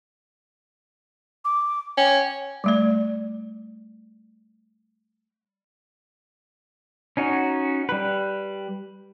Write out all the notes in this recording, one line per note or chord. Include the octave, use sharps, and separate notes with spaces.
D6
C#4 G5
G3 A3 D5
C#4 D#4 F#4
G3 B4